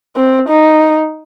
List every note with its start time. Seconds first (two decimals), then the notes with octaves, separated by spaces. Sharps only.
0.16 C4
0.49 D#4